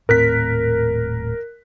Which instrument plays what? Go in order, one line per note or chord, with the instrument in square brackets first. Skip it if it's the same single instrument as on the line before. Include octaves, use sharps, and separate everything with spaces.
[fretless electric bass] D#1 A2 C4 [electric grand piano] A#4 F#6 B6